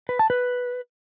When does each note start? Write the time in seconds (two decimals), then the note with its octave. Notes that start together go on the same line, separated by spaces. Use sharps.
0.09 B4
0.19 A5
0.30 B4